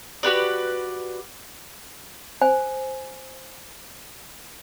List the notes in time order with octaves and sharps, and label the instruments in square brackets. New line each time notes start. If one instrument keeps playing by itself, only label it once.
[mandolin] F#4 G4 B4 D5
[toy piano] C5 G#5